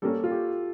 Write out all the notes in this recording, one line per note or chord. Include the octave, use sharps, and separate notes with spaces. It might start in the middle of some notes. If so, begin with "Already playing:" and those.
G3 A#3 C#4 A4
F4
G4